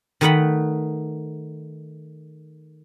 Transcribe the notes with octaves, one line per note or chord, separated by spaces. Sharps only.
D#3 A3 D#4 B4 F#5 B5